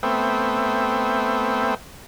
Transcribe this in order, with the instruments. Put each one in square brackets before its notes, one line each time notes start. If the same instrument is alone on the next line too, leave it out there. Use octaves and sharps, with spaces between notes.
[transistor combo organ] A3 B3 C4 E5 G5